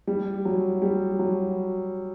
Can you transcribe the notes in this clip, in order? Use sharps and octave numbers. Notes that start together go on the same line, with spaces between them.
G3
F#3
G3
F#3